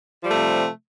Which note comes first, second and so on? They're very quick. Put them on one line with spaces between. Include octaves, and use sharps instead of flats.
F3 G3 A3 C3